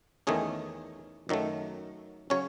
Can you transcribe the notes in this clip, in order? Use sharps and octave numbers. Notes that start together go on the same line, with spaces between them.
E2 D#3 A3 C#4 G#4
F#2 D#3 F#3 A3
C#3 F#3 C#4 C#5